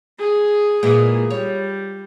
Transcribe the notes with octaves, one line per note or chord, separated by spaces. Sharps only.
G#4
A#2 E3 G#3 G#4
G3 C#5